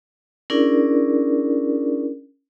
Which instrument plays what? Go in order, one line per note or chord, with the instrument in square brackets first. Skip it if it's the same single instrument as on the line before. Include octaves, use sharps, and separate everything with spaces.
[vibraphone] C#4 D4 E4 G#4 A#4 D5